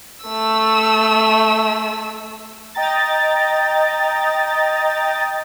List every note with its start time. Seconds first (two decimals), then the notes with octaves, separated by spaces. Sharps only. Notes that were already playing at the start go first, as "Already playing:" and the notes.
0.23 A3 E6
2.75 D#5 G5 A#5 A6